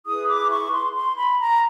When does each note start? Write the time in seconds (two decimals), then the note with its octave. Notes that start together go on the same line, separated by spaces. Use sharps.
0.05 E4 G#4 B4 D#6
0.27 D6
0.50 C#6
0.72 C6
0.93 C6
1.16 B5
1.38 A#5